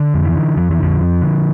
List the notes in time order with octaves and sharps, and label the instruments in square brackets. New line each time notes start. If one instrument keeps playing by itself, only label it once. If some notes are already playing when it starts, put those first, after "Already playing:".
Already playing: [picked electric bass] D3
F2
E3
D3
F2 F3
E3
F2 D3 F3
F2
D3